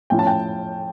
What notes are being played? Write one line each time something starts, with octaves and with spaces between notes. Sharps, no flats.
A2 F3 C#4 E4 G5
A5
G5